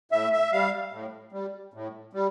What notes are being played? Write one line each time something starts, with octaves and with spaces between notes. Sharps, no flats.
A2 E5
E5
G3 F5
A2
G3
A2
G3